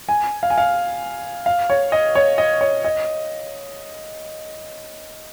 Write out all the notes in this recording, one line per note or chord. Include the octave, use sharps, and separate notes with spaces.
G#5
F5
G#5
F5
F5
C#5
D#5
C#5
D#5
C#5
D#5